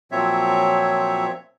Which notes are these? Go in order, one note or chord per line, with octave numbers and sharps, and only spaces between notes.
A#2 F3 F#3 C4 C#5 E5